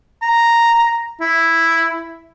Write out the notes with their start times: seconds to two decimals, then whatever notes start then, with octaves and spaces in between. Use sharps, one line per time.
0.23 A#5
1.21 E4